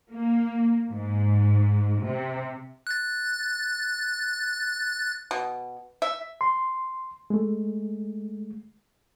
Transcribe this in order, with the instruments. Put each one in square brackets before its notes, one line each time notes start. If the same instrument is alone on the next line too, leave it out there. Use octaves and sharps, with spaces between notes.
[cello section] A#3
G#2
C3
[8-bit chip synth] F#6 A6
[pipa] B2
E5
[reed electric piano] C6
G#3 A3